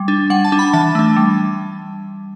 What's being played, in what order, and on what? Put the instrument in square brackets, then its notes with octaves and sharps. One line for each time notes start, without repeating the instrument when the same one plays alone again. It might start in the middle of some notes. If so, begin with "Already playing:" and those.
Already playing: [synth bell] G3
D4
G3 F#5
A5
D4
B5
E3 A5
A3 D4
G3